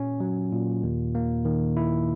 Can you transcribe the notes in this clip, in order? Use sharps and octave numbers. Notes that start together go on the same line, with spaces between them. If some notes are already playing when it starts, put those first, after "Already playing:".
Already playing: A#2 C#4
F#3
A#2
D#2
A#3
D#3
E4